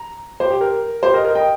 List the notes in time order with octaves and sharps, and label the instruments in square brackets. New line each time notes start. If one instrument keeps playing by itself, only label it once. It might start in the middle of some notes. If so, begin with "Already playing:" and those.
Already playing: [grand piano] A#5
G4 C5
G4
A#4
G4 C5
A#4 D#5
A#4 D#5
D#5 G5